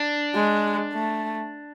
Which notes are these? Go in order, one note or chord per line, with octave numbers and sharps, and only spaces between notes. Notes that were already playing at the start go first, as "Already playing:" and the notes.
Already playing: D4
G#3
A3